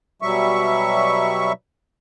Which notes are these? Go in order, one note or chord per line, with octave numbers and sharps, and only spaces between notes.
B2 F#3 G3 E5 C#6